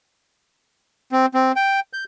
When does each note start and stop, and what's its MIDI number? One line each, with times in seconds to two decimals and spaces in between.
1.12 1.26 60
1.34 1.52 60
1.56 1.80 79
1.93 2.04 91